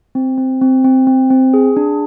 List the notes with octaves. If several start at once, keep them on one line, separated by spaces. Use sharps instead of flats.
C4
C4
C4
C4
C4
C4
G#4
D4